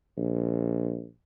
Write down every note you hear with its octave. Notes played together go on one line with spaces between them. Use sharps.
A#1